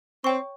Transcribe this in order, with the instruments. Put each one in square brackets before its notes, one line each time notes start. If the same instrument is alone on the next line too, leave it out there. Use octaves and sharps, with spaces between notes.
[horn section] C4 [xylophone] C#5 G5 C#6